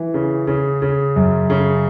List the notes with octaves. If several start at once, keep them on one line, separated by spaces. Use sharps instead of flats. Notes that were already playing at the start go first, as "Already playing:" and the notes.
Already playing: E3
C#3
C#3
C#3
F#2
C#3